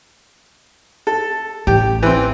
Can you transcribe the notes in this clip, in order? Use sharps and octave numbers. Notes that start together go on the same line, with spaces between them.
A4
A1 G4
E3 C4